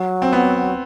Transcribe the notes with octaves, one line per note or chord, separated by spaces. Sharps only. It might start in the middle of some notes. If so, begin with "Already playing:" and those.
Already playing: F#3
C4
B3